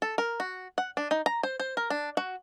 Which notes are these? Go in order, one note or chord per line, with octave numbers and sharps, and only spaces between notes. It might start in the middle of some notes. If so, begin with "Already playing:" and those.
A4
A#4
F#4
F#5
D4
D#4
A#5
C5
C5
A#4
D4
F#4